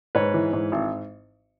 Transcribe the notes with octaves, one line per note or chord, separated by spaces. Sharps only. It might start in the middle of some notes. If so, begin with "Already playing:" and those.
G#2 B4 C#5
E3
G#2
G#1